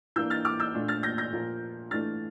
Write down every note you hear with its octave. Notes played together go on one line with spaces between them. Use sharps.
E3 A#3 D4 E6 G6
F6 A6
D6 F6
E6 G6
A#2 A3 D4
F6 A6
G6 A#6
G6 A#6
A#2 F3 A#3
E3 A3 D4 F6 A6